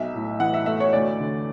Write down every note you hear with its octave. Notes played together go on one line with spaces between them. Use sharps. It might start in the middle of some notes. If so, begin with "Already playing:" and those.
Already playing: B1 E5
A2
E3 F#5
E5
A3 E5
C#5
D2 D5
D3